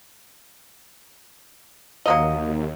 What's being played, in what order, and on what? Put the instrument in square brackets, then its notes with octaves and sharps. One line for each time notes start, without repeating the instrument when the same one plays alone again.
[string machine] D#2 [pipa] F#3 A#3 D#5